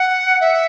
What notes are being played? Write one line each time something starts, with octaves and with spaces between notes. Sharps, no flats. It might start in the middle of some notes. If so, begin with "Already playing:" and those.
Already playing: F#5
E5